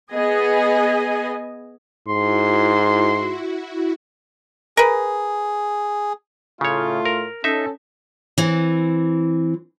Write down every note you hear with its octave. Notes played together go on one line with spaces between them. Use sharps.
B3 G#4 D#5 G#5
G#2 E4 F#4 C6
G#4 A#4 B4
A2 C#3 A3 F4 C#5
A#4
C#4 D#4 A4 E5
E3 C4